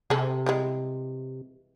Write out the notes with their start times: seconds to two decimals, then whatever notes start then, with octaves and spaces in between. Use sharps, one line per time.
0.10 C3 G#4 A4
0.46 E3 G3 G#3